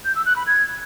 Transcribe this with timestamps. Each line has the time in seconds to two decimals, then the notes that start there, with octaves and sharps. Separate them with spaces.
0.05 G6
0.15 E6
0.26 F#6
0.36 B5
0.47 G#6